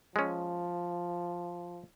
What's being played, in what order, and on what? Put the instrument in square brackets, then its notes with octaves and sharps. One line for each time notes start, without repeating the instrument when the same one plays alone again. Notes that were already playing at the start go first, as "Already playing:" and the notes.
[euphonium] F3 [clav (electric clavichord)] G#3 C#4